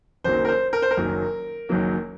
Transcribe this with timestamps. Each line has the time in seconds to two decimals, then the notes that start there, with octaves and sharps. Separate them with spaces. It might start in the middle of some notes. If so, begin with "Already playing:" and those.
0.24 F#1 F#2 D#3 F#3 A#3 C5
0.45 A#4
0.49 C5
0.73 A#4
0.82 C5
0.91 A#4
0.97 F#1 F#2 D#3 F#3 A#3
1.69 F#1 F#2 D#3 F#3 A#3